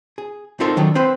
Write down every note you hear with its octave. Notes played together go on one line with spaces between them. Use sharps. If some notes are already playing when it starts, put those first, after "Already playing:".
G#4
C4 D#4 F4 A4 A#4 C5
D3 D#3 F#3
C4 B4 C5